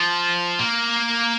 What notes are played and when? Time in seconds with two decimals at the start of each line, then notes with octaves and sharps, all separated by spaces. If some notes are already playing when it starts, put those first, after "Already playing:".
Already playing: F3
0.59 A#3